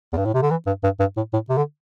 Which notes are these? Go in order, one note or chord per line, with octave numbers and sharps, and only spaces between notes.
E2
G2
A2
C3
D3
E3
G2
G2
G2
A2
A2
C3
D3